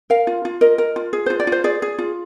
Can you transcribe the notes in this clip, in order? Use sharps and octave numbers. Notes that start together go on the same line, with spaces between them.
A#4 F5
F4
F4
A#4 D#5
A#4
F4
G#4
F4 C5
D5
F4
C5
G#4 D5
G#4
F4